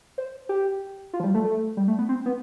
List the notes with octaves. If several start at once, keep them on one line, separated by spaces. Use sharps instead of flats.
C5
G4
F4
F3
G3
A3
A3
G3
A3
B3
C4
B3